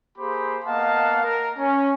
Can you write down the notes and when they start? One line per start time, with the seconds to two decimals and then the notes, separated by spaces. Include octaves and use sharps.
0.18 A#3 G4 G#4 C5 B5
0.65 A#3 B3 D#5 F5 F#5 A5
1.24 A#4
1.58 C#4